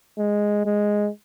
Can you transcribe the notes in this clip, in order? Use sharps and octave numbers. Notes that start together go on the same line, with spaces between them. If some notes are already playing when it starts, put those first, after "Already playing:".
G#3
G#3